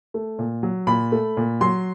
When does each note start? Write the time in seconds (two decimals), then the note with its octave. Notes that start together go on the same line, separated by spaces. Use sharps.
0.14 A3
0.39 A#2
0.63 F#3
0.87 A#2 B5
1.12 A3
1.37 A#2
1.61 F#3 C6